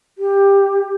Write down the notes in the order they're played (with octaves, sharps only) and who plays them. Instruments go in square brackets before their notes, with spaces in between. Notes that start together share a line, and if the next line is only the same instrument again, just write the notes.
[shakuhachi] G4